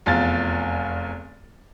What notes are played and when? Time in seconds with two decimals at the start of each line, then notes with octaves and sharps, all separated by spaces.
0.06 F1 E2 F4 A6